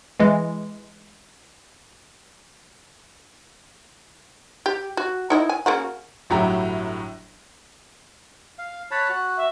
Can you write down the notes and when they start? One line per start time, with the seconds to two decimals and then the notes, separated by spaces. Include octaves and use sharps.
0.20 E3 G#3
4.66 G4
4.97 F#4
5.30 D#4 E4 D#5
5.49 G#5
5.66 C#3 A#3 F#4
6.30 G1 A2 F#3 E4 G4 A#5
8.58 F5
8.91 C#5 A5 B5 F#6
9.09 F#4
9.37 E5